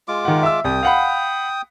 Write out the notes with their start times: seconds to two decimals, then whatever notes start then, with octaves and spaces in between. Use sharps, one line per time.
0.08 G#3 F4 D6
0.25 D#3 F#5
0.43 E5 E6
0.64 C2 G5 D#6
0.83 F5 F#5 B5